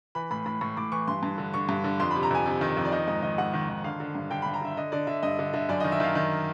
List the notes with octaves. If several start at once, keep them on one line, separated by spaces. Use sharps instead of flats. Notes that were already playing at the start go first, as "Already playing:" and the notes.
E3 B5
A2 B5
A2 B5
A2 C#6
A2 D6
E3 C#6
G2 C6
G2
D3
D3 C#6
G2
D3
F2 C6
C3 B5
A#5
F2 G#5
C3
D#3
F2
D5
D#3 D#5
G#2 D#5
D#3 D#5
G#2 F#5
D#3
D#3
D3 F5
D3
G2
D3 G5
G2 B5
A#5
D3 E5
D3 D#5
D3 D5
D3 E5
G2 D#5
D3
D3 E5
F#2 D5
D#3 D#5
E5
D#3 F5
D#3